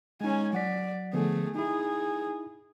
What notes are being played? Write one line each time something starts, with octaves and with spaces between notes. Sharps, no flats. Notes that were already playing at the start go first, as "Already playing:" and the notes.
G#3 C#4 D#4 G#5
F#3 D5 F#5 B6
D3 F3 A3 B3 G#4
D#4 E4 G#4